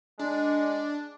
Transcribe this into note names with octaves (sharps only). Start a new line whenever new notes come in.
G#3 D4